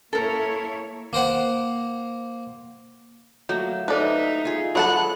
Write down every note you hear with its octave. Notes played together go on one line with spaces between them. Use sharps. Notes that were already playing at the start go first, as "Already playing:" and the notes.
A#3 E4 A4 A#4 C#5
A#3 A#4 C5 F#5
F#3 A3 A#3 C#5
D#4 E4 A4 B4 C5 D5 E5
F4 G#4
F#3 F#4 A4 F#5 A5 B5 F#6